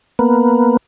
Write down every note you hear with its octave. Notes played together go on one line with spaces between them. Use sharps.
A#3 B3